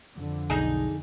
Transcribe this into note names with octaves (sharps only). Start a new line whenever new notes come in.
F2 D3
B1 D#4 G#4